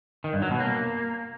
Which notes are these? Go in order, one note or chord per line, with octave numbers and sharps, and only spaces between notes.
D#3
G2
F#3
B2
A#3